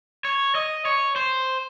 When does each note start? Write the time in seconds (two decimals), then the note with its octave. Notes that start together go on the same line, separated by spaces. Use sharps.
0.25 C#5
0.55 D#5
0.85 C#5
1.16 C5